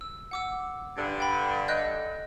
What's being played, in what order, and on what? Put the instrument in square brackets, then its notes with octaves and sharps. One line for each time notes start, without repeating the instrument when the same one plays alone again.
[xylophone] E6
F#5 D6 E6
[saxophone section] G2 D3
[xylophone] G5 B5
D#5 F#6 G6